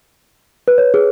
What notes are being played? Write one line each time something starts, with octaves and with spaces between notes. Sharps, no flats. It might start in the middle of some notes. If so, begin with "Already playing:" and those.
B4
C#5
G#4